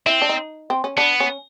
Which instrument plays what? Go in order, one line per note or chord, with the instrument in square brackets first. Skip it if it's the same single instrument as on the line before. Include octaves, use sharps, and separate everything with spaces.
[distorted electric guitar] C4 [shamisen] E4
[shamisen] D4
D#4
C4
C#4
[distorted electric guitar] B3 [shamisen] D4
[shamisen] C#4